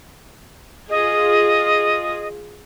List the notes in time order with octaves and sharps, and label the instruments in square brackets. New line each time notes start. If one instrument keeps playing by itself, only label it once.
[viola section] F4 G#4 [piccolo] D#5